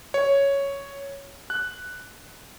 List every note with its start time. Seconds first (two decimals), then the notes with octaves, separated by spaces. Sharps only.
0.14 C#5
1.50 F#6